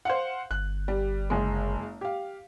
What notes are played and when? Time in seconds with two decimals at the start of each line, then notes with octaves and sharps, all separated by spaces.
0.05 C5 F5 F#5
0.51 G1 F#6
0.88 G3
1.30 F#1 G#3
2.01 G4 F5